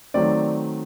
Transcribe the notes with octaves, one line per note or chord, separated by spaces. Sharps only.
D#3 F#3 A3 C4 D5